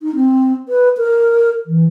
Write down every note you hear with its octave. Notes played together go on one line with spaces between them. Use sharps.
D#4
C4
B4
A#4
E3